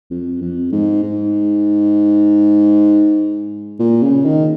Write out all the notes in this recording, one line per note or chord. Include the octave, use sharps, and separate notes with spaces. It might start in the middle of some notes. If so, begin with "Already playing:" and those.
F2
F2
G#2
G#2
A#2
C#3
D#3